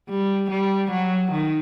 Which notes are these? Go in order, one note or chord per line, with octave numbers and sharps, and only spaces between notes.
G3
G3
F#3
D#3